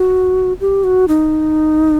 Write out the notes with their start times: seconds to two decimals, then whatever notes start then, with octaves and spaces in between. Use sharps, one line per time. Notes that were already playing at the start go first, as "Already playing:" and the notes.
Already playing: F#4
0.60 G4
0.84 F#4
1.08 D#4